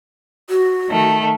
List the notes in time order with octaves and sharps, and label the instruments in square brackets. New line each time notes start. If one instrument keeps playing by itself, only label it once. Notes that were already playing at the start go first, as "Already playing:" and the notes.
[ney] F#4
[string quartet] D#3 A3